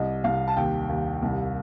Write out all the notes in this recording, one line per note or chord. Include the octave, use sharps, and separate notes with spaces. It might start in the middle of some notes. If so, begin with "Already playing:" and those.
Already playing: C2 D#5
C2 F5
A5
D#2 G5
D#2
C2